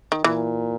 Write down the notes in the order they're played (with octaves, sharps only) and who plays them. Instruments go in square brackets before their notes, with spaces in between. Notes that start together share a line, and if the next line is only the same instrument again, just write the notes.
[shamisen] D#3
[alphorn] A#2 [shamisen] E3